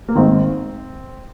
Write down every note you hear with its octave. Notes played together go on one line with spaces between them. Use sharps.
A#3
G#1 G#2 D#3 C4